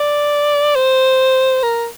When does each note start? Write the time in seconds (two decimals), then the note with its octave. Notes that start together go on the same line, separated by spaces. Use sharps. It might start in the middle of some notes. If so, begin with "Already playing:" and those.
Already playing: D5
0.75 C5
1.63 A#4